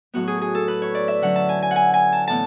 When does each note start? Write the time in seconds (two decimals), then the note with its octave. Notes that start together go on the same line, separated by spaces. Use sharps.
0.14 A2 F#3 B3 F#4
0.28 G#4
0.41 G#4
0.55 A4
0.68 B4
0.82 C#5
0.95 D5
1.08 E5
1.22 D3 F#3 C#4 F#5
1.36 A5
1.49 G#5
1.62 G#5
1.71 F#5
1.76 G#5
1.94 G#5
2.13 A5
2.28 A2 E3 B3 A5